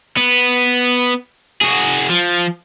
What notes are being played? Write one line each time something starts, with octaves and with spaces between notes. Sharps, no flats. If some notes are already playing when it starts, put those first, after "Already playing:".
B3
F#4 G#4
F3